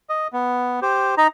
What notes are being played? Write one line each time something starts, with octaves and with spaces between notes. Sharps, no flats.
D#5
B3
G4 C5
D#4 A#5